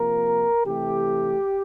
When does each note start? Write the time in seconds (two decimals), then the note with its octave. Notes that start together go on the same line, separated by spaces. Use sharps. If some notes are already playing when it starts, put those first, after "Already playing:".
Already playing: C3 F3 A#3 A#4
0.64 C3 E3 A3 G4